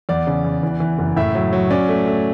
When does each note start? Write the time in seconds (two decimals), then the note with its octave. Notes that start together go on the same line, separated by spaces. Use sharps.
0.09 E2 D5
0.27 C#3
0.45 E2
0.63 E3
0.80 E3
0.99 F#1
1.16 A2 E5
1.35 F#3
1.53 F#3
1.70 C#4 D5
1.89 A3
2.06 A3